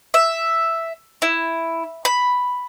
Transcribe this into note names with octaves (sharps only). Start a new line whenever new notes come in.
E5
E4
B5